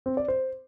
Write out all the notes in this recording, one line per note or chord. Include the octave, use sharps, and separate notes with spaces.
C4
D5
C5